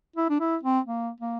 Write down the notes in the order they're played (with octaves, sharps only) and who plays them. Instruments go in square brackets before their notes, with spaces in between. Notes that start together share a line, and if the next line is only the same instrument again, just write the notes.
[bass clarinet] E4
D4
E4
C4
A#3
A#3